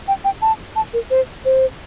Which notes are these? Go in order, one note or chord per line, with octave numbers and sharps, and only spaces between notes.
G5
G5
A5
A5
A#4
C5
C5